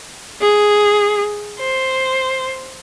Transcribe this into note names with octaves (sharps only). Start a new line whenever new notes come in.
G#4
C5